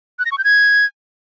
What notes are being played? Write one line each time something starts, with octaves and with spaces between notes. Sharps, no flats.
F#6
A#6
C#6
G6
G#6